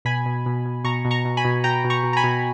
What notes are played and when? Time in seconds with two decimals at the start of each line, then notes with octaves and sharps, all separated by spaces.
0.05 B2 G#5 B5
0.26 B2
0.46 B2
0.66 B2
0.84 B2 A#5 C#6
1.05 B2
1.11 A#5 C#6
1.25 B2
1.37 G#5 B5
1.45 B2
1.64 B2 G5 A#5
1.84 B2
1.90 A#5 C#6
2.03 B2
2.13 A#5
2.17 G#5 B5
2.24 B2